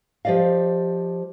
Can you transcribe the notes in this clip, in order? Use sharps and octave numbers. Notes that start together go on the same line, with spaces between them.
F3 G4 D5 D#5 F5